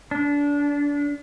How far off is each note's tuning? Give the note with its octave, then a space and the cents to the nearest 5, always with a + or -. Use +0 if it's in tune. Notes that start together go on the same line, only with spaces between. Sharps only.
D4 -25